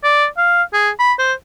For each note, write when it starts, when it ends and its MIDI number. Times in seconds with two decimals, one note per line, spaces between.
0.04 0.27 74
0.38 0.63 77
0.73 0.90 68
0.99 1.13 83
1.19 1.33 72